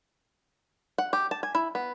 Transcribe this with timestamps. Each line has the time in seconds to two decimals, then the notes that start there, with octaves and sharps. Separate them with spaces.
0.98 F#5
1.13 G4
1.31 A5
1.43 G#5
1.55 E4
1.75 B3